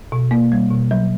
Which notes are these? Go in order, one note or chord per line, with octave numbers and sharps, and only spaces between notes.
B2
A#3
G3
B2
F#3